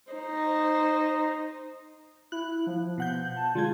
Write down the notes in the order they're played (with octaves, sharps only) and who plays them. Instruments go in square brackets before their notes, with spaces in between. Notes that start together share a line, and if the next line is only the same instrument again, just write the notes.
[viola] D#4 C5
[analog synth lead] E4 [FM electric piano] F#6
[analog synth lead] F3
[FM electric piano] B2 F#5 G6
[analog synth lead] A5
[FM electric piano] D3 G#3 G#6 [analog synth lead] F4